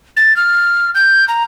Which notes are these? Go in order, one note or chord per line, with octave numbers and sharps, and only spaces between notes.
A6
F6
G6
A#5